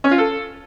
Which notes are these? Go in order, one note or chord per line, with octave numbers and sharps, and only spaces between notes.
C#4
F4
A4